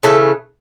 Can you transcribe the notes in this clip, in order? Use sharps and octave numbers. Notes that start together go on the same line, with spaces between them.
C#3 E3 A3 A4